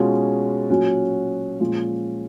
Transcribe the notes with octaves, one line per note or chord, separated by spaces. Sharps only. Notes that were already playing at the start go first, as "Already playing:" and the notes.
Already playing: B2 G#3 C#4 F4
A#2 F#3 C#4 F#4
A#2 F3 G#3 C#4 F4